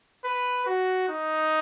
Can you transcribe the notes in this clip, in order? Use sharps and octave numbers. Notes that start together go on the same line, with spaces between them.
B4
F#4
D#4